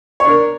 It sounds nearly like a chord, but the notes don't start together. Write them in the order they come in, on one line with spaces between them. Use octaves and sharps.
C#5 D4 A#4